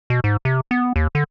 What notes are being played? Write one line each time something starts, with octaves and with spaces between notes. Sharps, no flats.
B2
G#2
C3
B3
D#2
D3